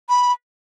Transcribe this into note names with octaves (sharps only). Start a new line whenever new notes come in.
B5